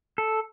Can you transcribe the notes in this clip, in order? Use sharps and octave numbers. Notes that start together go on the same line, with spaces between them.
A4